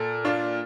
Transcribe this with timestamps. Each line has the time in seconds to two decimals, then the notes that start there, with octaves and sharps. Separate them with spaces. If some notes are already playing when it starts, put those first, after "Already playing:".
Already playing: A#2 A4
0.25 D4 F4